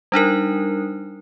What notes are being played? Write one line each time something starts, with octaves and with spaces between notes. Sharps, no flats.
G3 D4 D#4 A#4